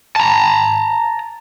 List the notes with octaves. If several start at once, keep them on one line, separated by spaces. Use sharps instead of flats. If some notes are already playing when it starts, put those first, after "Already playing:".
A5 A#5